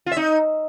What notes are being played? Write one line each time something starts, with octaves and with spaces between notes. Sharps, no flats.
F4
E5
D#4